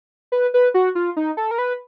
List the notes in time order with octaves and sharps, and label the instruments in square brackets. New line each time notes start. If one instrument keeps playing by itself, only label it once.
[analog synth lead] B4
B4
F#4
F4
D#4
A4
A#4
B4